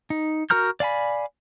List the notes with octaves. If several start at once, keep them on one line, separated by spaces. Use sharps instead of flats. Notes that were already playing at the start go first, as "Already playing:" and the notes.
D#4
F#4 A#4 A#5 F6 G6
D5 F5 G#5 B5